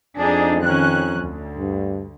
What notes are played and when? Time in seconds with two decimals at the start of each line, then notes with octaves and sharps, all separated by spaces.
0.18 F2 D4 D#4 G#4
0.64 D#3 C#4 F#6
1.20 D2
1.58 G2